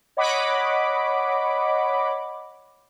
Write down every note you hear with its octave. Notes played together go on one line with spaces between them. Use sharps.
C#5 D#5 F#5 B5 D6